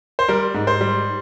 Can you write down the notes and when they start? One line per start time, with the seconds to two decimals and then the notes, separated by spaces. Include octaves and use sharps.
0.19 C5
0.28 G3 A#4
0.54 G#2
0.67 C5
0.81 G3